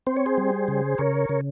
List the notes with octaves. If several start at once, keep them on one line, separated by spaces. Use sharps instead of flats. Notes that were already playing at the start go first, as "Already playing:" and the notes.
C4 C5
C#5
G#4 C5
G3
C#3
C#3 A#4 C#5
C#3